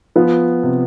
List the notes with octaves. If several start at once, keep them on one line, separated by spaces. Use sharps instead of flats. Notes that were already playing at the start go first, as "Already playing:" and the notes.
F3 B3
C3